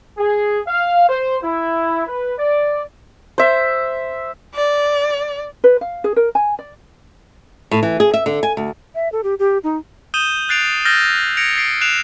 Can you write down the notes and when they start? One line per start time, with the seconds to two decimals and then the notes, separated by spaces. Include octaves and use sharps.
0.18 G#4
0.67 F5
1.09 C5
1.43 E4
2.07 B4
2.38 D5
3.38 C5 E5
4.55 D5
5.64 B4
5.81 F5
6.04 G#4
6.16 A#4
6.35 G#5
6.59 D5
7.71 A2
7.83 E3
8.00 G#4
8.13 E5
8.26 D3
8.43 G#5
8.57 D2
8.95 E5
9.12 A4
9.23 G4
9.39 G4
9.64 D#4
10.14 D#6 G6 D#7 E7 G7
10.49 F#6 A6 C7 D7 F7
10.85 E6 F6 G6 A6 A#6 G7
11.37 G#6 A#6 C#7 D7 F7
11.56 A6 C7 D7
11.81 F#6 C7 D7 E7 F7